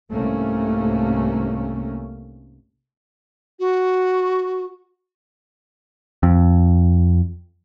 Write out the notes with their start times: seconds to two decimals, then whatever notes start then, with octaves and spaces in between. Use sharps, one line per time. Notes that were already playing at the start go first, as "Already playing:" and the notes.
0.12 C2 G#2 C3 A3 A#3 C#4
3.60 F#4
6.23 F2